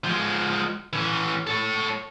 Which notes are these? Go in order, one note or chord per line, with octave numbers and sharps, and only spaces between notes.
F3 G#3
E3 C#4
A4 C#5